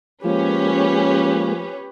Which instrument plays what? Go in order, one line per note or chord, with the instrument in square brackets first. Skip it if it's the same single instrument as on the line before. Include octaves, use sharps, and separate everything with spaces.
[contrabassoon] F3 [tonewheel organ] G#3 A#3 [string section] C#4 [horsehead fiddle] G4 B4